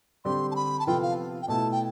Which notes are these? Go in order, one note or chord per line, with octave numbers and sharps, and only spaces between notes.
D3 G3 C4 G4 C6
A5
B5
A5
C3 F3 B3 F4 A4 G5
F5
G5
B2 A3 E4 A5
G5